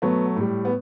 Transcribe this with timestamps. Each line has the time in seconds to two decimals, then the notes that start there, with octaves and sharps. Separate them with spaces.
0.02 B2 F#3 A3 B3
0.36 A2 G3
0.65 B3